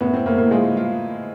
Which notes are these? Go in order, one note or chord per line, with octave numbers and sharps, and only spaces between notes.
A2 B3
C4
A2 A#3
A#3
G#3 F4
F4